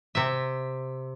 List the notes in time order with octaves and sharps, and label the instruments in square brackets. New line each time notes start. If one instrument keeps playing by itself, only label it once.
[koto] C3 E5